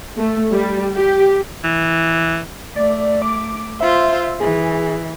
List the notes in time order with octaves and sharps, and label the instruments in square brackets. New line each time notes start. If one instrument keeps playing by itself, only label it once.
[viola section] A3
G3
G4
[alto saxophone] E3
[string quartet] A3 [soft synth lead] D5
[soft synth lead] D6
[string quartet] F4 C5 [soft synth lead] E5
[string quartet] E3 [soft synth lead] G#4